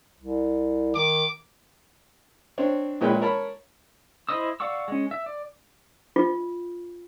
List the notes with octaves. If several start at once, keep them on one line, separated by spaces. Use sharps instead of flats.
C2
D#3 D6
C4 D4 C#5
A#1 A#2 G#3 B4 C#5 G5
A#4 C#5 A5 B5
E4 C5 D#5 D#6 E6
D5 F5 F#5 C#6 E6
G#3 C#4
E5
D5
F4